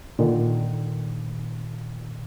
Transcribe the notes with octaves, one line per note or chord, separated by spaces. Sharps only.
A#2 D3 D#3